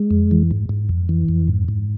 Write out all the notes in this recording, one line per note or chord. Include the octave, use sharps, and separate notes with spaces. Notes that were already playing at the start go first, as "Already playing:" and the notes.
Already playing: G#3
F2
E3
G#2
G#2
F2
E3
F2
G#2
G#2